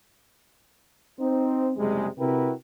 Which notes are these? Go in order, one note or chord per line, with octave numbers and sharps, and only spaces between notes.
C4 D#4 C5
F#1 C3 G3 G#3
C3 E4 F#4 A#4 B4 G5